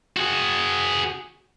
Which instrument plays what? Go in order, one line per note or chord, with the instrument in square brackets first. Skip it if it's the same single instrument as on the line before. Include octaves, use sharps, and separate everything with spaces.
[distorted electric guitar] F#4 G#4